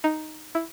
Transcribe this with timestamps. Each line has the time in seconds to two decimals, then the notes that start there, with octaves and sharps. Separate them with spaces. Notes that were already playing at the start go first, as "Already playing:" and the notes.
0.04 D#4
0.55 E4